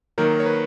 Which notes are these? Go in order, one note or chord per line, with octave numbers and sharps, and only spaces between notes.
D#3 F#3 A#3 A#4
C#5
B4